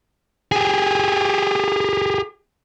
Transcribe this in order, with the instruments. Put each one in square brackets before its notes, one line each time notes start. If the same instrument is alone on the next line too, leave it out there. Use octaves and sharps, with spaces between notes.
[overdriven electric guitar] G4 G#4